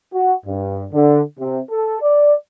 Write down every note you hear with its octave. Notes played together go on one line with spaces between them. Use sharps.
F#4
G2
D3
C3
A4
D5